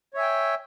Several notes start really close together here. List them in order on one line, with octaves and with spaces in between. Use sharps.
C#5 E5 G#5 G5